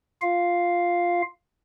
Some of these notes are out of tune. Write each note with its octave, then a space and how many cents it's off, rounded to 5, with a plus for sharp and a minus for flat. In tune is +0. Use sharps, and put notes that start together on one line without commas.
F4 +0 F5 +0